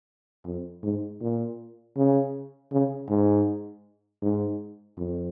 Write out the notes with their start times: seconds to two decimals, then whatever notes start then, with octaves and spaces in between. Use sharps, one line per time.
0.46 F2
0.83 G#2
1.21 A#2
1.97 C#3
2.72 C#3
3.09 G#2
4.22 G#2
4.98 F2